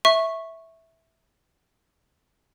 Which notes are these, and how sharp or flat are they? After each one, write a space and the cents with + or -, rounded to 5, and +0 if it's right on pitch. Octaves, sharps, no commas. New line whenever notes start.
E5 -10 C#6 -10